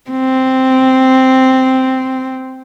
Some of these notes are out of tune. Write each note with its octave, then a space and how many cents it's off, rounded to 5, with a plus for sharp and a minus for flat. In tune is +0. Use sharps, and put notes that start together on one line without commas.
C4 -5